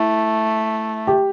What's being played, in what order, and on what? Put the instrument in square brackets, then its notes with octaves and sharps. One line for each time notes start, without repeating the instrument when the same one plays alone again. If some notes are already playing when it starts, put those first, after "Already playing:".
Already playing: [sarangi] A3 [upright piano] E4
[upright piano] G4